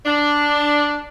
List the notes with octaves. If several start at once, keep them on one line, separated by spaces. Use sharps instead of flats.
D4